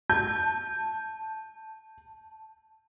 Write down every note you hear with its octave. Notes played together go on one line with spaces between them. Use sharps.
A5 G6